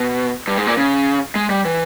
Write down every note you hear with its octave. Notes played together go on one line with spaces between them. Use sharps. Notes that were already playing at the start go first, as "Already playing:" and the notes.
Already playing: B2
G2
G#2
A#2
C#3
G#3
G3
E3